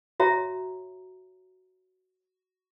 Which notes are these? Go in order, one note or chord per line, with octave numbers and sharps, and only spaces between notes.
F#4 C#5 E5 A#5